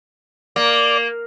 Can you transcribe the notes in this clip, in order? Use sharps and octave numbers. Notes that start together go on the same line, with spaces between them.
A#3 D5